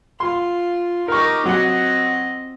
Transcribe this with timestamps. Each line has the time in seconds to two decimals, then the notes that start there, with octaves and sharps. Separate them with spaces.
0.20 F4 C6
1.08 D#4 G4 A#4 C#6
1.45 F#3 C4 D#5 F#5